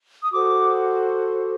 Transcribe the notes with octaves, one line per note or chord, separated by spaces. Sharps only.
D#6
F#4 A4 C5 D6